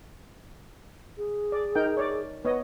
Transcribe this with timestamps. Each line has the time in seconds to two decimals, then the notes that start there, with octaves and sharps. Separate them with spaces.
1.18 G#4
1.52 D5
1.75 D#4 A#4 G5
1.97 C#5 D5
2.45 B3 B4 C#5 D#5